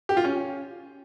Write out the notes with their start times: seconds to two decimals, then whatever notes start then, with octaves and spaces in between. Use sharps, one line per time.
0.09 G4
0.17 F4
0.24 C#4